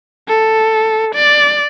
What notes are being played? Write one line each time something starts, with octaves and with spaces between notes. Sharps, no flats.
A4
D5